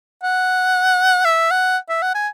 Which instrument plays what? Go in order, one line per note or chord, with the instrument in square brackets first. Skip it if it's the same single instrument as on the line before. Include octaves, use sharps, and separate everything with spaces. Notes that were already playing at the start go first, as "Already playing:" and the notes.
[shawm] F#5
E5
F#5
E5
F#5
G#5